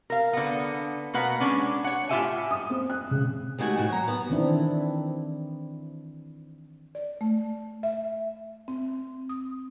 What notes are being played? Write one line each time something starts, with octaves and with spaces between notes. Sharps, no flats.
A#4 F5
D3 B3
B2 A#3 B4 F#5
G#3 C#4 D4
C#5 F#5
A2 F4 G4 E5 G5 G#5
D#6
C4
F#6
C#3
D#2 G#3 A3 F#4 G#5
A2 D#3 F#4
F#3 A#5
B3
D#3 E3 C4 D4 E4
D5
A3
E5
C4
D#6